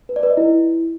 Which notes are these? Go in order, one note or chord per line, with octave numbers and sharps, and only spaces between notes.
B4
D5
B4
D#5
E4